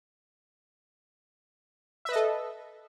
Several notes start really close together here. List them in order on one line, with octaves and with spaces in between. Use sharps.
E5 B4 D#5 A4